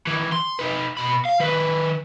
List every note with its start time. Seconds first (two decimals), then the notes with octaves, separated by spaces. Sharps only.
0.07 D#3 E3
0.33 C6
0.59 D#4 B4
0.97 B2 B5
1.25 F5
1.40 D#3 B4